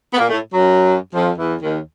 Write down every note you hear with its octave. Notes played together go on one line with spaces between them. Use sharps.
B3
A#2 A#3
A2 A3
F#2 F#3
F2 F3
E2 E3
D#2 D#3